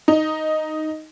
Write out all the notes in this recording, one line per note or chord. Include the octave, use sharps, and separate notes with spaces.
D#4